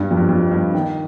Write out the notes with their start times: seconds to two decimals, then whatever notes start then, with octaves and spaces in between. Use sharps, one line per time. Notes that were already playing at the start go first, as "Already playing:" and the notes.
Already playing: G2
0.11 F2
0.17 G2
0.29 F2
0.51 G2
0.74 D#3